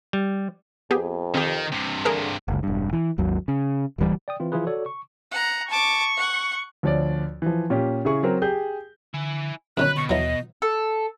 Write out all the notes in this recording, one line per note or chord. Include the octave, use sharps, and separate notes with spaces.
G3
F2 B3 G4 G#4
D#3 C4 G4
G2 C3
D3 G#4 A#4
F#1 C#2
E1 G2
E3
G#1 D#2 F#3
C#3
D1 C#2 E3 G3
D5 G5 D#6
E3 C4 F4
E3 F3 E4 F4 G#4 B4
F#4 A4 C#5 D5
C#6
F#5 A#5
A5 C#6 D6
F#5
D2 F3 C#5 D5
E3 F3
A#2 C#4 G4
C#3 E4 G#4 C#6
F#3 C4 A#4
G4 G#4 G6
D3 E4 G#5
F#2 D3 D#3 C#4 B4 F#6
B2 C#6
D#2 E3 F#3 D#5
A4